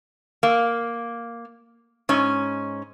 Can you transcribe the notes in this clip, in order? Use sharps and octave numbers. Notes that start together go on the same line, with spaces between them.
A#3
G#2 C#4